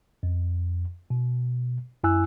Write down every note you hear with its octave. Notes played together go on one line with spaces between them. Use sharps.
F2
B2
F#2 E4 G#5 E6 F#6